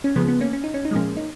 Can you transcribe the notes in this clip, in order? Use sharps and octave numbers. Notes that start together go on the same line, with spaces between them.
C#4
C#3 F3 G#3 B3
B3
A#3 C#4
C#4
D#4
C#4
D#4
A#2 F3 G#3 A#3 C#4
D#4